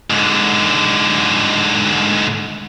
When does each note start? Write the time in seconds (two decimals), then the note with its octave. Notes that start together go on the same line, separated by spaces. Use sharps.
0.10 G#2 D3